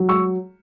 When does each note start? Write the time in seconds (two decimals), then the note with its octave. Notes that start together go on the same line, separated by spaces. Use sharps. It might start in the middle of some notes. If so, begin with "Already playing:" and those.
Already playing: F#3
0.09 C#6 E6